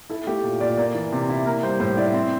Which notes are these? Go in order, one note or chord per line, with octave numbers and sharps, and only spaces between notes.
E4 A4
A3 G4
A#2
A#2 D5
A#3 D5
E3
C3
E4
A#3 A#4
G3 C5
A2 C5
E4 D5
C4